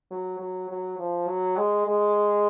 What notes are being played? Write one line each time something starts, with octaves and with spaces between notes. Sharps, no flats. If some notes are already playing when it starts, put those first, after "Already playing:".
F#3
F#3
F#3
F3
F#3
G#3
G#3